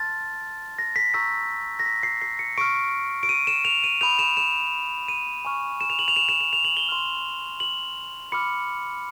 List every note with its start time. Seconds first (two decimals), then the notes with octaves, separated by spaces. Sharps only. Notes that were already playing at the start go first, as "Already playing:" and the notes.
Already playing: A5 C6 F6 A6
0.79 A#6
0.96 B6
1.14 A#5 C#6 E6 G6 B6
1.79 A#6
1.86 B6
2.03 C7
2.22 C7
2.39 C#7
2.58 C#6 F6 D7
3.23 D7
3.29 D#7
3.47 E7
3.65 F7
3.84 D#7
4.01 B5 D#6 G6 F7
4.19 E7
4.37 E7
5.08 D#7
5.45 G#5 C#6 F6
5.81 E7
5.90 F7
5.99 F#7
6.08 F7
6.16 E7
6.29 E7
6.41 E7
6.53 F7
6.65 F#7
6.77 G7
6.89 C6 F6
7.60 F#7
8.32 B5 D6 F6 C#7